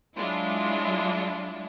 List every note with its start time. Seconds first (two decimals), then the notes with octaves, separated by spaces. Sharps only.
0.16 F#3 G#3 D4 E4 F4